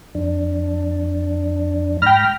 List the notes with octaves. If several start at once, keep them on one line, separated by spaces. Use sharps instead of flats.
F2 D4
G#2 G5 B5 F6 A#6